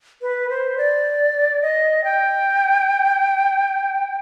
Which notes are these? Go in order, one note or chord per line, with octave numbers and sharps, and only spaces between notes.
B4
C5
D5
D#5
G5